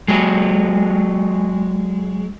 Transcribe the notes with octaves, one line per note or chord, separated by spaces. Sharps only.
F#3 G#3